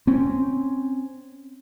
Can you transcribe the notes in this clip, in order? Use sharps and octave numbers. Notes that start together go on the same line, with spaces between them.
C4 C#4